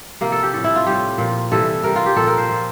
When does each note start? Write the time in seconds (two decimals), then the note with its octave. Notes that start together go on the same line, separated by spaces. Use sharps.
0.21 C3 F3 A#3
0.32 A4
0.43 G4
0.53 A2 F3 A4
0.64 E4
0.76 F4
0.86 A2 G3 G4
1.18 A#2 F3
1.51 C3 E3 G3 A4
1.83 C3 G3 A#4
1.96 F4
2.06 G4
2.16 A#2 F3 A4
2.27 A#4
2.38 C5
2.49 A#2 F3